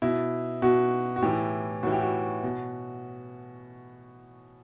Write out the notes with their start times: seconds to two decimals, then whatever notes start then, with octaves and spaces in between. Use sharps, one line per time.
0.02 B2 E4
0.62 B2 F#4
1.16 F#4
1.22 A2 E3 G4
1.83 A2 E3 F#4
1.92 G4
2.01 F#4
2.43 B2